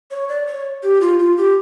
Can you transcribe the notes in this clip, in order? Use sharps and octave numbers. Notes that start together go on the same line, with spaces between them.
C#5
D5
C#5
G4
F4
F4
G4